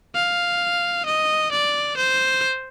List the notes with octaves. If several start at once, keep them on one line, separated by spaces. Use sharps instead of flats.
F5
D#5
D5
C5